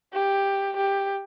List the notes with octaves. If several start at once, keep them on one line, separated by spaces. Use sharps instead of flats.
G4
G4